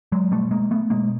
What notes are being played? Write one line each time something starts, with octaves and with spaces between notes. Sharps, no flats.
F#3 G#3
B2 G3 A3
G#3 A#3
A3 B3
B2 G#3 A#3